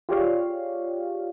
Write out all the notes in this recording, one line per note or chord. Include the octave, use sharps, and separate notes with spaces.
F4 G4 G#4 C#5 D5 F5